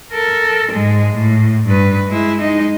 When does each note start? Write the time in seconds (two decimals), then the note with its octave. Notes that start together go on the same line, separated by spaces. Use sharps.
0.13 A4 A#4
0.72 G#2 G#3
1.12 A2
1.67 G2 B4
2.09 G#3 E4
2.41 G#3 D#4